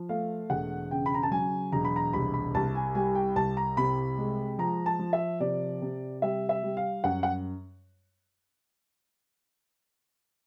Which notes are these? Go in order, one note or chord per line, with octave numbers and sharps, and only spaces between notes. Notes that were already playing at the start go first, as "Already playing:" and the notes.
Already playing: F3
A3 F5
E1 F#5
C#3 G5
B5
A#5
A5
F#3 G#5
E1 A#5
B5
A#5
C2 B5
B5
C2 A5
G#5
G3 G#5
G5
C2 A5
A#5
C3 B5
G#3
F3 A#5
A5
F3
E5
C3 D5
C3
G3 E5
E5
G3
F5
F#2 F#5
F#5